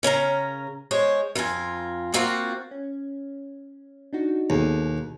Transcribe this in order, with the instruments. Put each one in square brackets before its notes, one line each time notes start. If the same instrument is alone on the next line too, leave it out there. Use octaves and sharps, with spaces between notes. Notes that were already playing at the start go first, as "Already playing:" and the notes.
[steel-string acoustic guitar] C#3 C#4 A#4 A#5
G#3 C5 C#5
F2 F4 A#4 G#5
A#3 C4 F4 F#4 F5 F#5
[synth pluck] C#4
D4 D#4 F#4
[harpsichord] D#2 [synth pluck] B2 G#4 A4